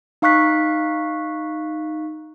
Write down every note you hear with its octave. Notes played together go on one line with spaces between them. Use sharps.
D#4 F5 C#6 F#6 B6